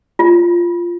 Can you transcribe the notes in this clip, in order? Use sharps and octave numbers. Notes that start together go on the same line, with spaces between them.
F4